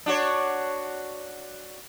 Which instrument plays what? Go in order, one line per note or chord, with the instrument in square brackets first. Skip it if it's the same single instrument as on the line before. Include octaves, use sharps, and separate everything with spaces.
[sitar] D4 F#4 C#5